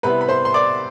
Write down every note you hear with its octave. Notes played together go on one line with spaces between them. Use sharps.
C3 G3 B3 E4 B4 B5
B5
C5 C6
C6
D5 D6